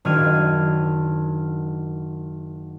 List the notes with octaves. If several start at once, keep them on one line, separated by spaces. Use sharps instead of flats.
F#1 D#3 D4 F6 G#6 D#7